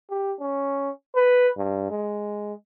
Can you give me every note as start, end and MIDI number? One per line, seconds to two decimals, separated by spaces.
0.11 0.33 67
0.41 0.90 61
1.15 1.49 71
1.57 1.90 43
1.91 2.54 56